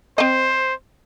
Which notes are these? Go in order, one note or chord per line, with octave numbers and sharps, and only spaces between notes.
C4 C5 D#5